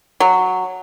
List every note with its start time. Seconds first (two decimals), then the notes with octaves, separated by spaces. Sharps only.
0.20 F#3